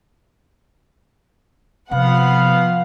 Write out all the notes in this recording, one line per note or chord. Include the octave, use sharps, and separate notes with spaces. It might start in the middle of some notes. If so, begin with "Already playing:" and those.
C3 F3 B3 F5 F#5